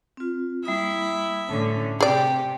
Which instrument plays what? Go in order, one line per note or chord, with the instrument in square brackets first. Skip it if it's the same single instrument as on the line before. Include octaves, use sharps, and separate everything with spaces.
[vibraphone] C4 F4
[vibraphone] G3 A#3 D#6 [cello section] E4 [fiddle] E5
[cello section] A2 D3 C#4 [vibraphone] A5 D6
[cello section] C3 [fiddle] G4 [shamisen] G#4 D5